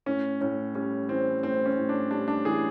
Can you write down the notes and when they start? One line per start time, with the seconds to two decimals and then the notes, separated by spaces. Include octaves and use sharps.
0.06 A2 C#4
0.41 A2 C#4
0.75 G3 C#4
1.08 E3 C4
1.43 A2 C4
1.66 C#4
1.77 A2
1.89 D4
2.11 G3 D4
2.28 D4
2.45 E3 G#4